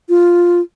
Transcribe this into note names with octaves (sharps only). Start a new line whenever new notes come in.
F4